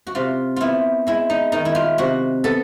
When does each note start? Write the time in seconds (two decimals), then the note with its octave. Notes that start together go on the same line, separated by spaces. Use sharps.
0.07 F#4
0.15 C3 F4
0.56 B3 E4 F4
1.07 G#3 E4
1.30 D#4
1.52 D#3 D#4
1.65 E4
1.75 F4
1.98 C3 F#4
2.44 B3 A4